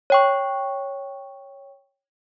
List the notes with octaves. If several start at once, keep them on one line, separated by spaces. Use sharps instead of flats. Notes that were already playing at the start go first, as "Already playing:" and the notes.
C#5 G5 C#6